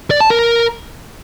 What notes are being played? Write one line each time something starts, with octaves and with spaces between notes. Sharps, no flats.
D5
A5
A#4